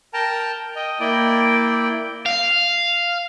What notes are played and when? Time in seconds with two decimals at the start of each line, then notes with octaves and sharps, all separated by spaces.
0.14 A#4 G5 A5 A#5
0.76 D#5 G5
1.00 A#3 E4 D5 G5
2.26 F5